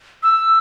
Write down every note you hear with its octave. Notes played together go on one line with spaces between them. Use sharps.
E6